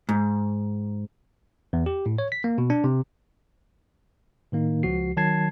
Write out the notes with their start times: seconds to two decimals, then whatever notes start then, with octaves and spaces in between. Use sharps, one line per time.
0.09 G#2
1.73 E2
1.86 G4
2.06 A2
2.18 C#5
2.32 B6
2.44 A#3
2.58 B2
2.70 D4
2.84 C3
4.52 A2 D#3 A#3 D#4
4.83 C#2 F3 F#4 C7
5.17 D#3 F#3 A5 G#6 C7